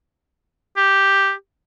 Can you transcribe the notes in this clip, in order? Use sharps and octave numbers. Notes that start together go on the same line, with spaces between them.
G4